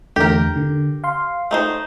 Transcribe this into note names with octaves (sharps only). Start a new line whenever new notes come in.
E2 D3 A3 G4 A#4
D3
F5 C6
A3 D#4 C5